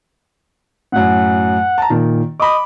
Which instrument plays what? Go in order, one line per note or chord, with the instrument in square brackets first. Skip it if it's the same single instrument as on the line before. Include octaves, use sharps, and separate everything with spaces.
[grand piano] F#2 A2 [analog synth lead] F#5
[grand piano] A5 A#5
[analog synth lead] A#2 [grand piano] D#3
[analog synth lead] D#5 [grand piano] B5 D6